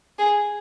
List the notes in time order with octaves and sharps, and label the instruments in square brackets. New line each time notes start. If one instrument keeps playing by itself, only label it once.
[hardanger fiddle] G#4